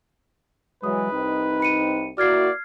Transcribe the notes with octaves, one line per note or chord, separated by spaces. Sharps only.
E3 F#3 G#3 B4 D#6
C2 C4 D#4
B5 C#7 D#7
A#3 E4 F#4 D5 F6 G#6 C7